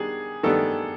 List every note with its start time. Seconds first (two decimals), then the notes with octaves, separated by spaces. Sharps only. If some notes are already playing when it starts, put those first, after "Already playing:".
Already playing: D#3 G3 B3 D4 G#4
0.43 D#3 G3 B3 D4 A4